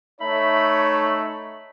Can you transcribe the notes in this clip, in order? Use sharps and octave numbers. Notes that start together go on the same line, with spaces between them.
A3 D#4 C#5 E5 B5